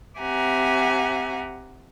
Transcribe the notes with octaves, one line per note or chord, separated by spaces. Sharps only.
C4 G4 E5 F#5 G#5 A#5